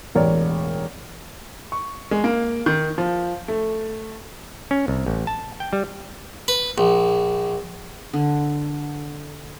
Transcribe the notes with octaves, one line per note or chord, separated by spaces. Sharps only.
E1 A1 A#4 C#5 D5
C#6
G#3
A#3
D#3
F3
A3
C#4
C2
A1
A5
G5
G3
B4
A#1
D3